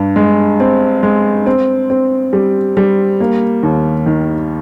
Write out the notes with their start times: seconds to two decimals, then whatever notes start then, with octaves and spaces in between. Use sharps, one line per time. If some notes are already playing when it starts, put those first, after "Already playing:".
Already playing: G2
0.16 G#3
0.60 C4
1.03 G#3
1.46 C4
1.90 C4
2.33 G3
2.77 G3
3.20 A#3
3.63 D#2
4.06 D#3